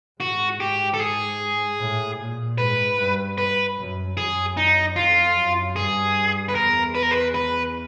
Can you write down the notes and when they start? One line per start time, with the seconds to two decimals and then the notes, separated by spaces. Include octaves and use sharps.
0.20 G#2 F#4
0.60 G4
0.94 A4
1.00 G#4
1.80 A2
2.19 A#2
2.58 G#2 B4
2.98 G2
3.38 B4
3.77 F#2
4.16 F#2 G#4
4.57 D#4
4.96 F2 F4
5.36 F#2
5.75 G2 G#4
6.49 B4
6.55 E2 A#4
6.95 B4
7.03 A#4
7.11 B4
7.34 B4